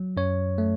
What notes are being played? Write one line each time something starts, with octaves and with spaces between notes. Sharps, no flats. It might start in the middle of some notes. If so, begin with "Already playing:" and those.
Already playing: F#3
F#2 C#5
A3